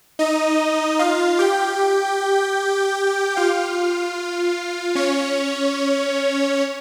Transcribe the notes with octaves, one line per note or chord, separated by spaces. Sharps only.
D#4 D#5
F4 F5
G4 G5
F4 F5
C#4 C#5